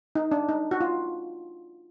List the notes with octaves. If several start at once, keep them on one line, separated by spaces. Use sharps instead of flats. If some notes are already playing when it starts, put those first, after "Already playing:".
D#4
D4
D#4
F#4
F4